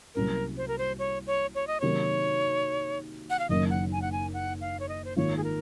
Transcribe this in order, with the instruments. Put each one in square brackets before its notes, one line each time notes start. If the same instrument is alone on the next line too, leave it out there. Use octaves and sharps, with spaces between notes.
[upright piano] C2 C3 F#3 A#3 C#4 [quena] A#4
[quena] C5
A#4
C5
C#5
C#5
C#5
D#5
[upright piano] C3 D#3 F#3 A#3 [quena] C#5
[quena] F#5
F5
[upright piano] F#1 F#2 D#3 A#3 [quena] D#5
[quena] F#5
G#5
F#5
G#5
F#5
F5
C#5
D#5
C5
[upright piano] G#1 G#2 D#3 A#3 F4 [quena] C#5
[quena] G#4
A#4